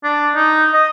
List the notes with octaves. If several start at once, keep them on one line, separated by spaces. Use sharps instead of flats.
D4
D#4
D#5